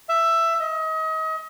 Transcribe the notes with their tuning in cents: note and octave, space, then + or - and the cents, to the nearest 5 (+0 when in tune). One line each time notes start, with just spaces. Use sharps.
E5 +10
D#5 +35